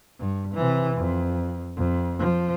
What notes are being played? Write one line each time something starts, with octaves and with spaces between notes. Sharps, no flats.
G2
C3 E3
F2
F2
F3